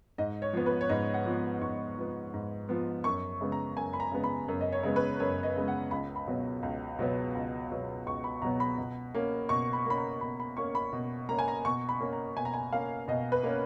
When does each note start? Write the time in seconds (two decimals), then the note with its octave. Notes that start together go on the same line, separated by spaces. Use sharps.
0.18 G#2 D#5
0.42 C#5
0.53 F3 B3
0.66 B4
0.81 C#5
0.89 G#2 D#5
1.14 F#5
1.26 F3 B3
1.61 G#2 C#6
1.97 F3 B3
2.34 G#2
2.69 F3 B3
3.04 F#2 C#6
3.41 C#3 G#3 B3
3.52 A#5
3.77 F#2 G#5
3.93 B5
4.00 A#5
4.12 C#3 G#3 B3
4.24 B5
4.48 F#2
4.61 D#5
4.72 C#5
4.83 C#3 G#3 B3
4.96 B4
5.20 F#2 C#5
5.43 D#5
5.56 C#3 G#3 B3
5.68 F#5
5.91 C#2 B5
6.16 B5
6.27 B2 F#3 B3
6.63 C#2
6.99 B2 F#3 B3
7.35 C#2
7.70 B2 F#3 B3
8.06 C#2 C#6
8.24 B5
8.42 B2 F#3 B3 A#5
8.60 B5
8.78 B2
9.14 A#3 C#4
9.49 B2 C#6
9.73 B5
9.86 A#3 C#4 B5
9.97 A#5
10.21 B2 B5
10.40 B5
10.57 A#3 C#4 C#6
10.75 B5
10.93 B2
11.29 A#3 C#4 A#5
11.39 G#5
11.48 A#5
11.65 B2 C#6
11.89 B5
12.00 A#3 C#4
12.13 A#5
12.37 B2 G#5
12.45 A#5
12.54 G#5
12.72 A#3 C#4 F5
13.08 B2 D#5
13.32 B4
13.43 A#3 C#4